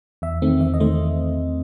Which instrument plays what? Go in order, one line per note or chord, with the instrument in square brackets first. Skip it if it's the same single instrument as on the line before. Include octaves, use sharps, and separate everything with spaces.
[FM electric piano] E2 E5
D#3 A3 C4
E2 E5
D#5
D#3 A3 C5